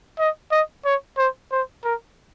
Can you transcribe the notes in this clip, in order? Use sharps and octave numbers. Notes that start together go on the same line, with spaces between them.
D#5
D#5
C#5
C5
C5
A#4